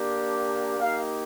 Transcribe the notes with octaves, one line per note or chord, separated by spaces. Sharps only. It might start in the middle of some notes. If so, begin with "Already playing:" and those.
Already playing: A#3 D4 G4
A#3 D#4 G4 F5